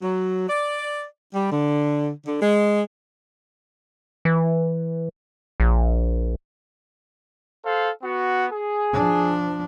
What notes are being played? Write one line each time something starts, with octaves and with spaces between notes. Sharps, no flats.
F#3
D5
G3
D3
D3
G#3
E3
A#1
A4 C5 F5
B3 F#4
G#4
F3 D4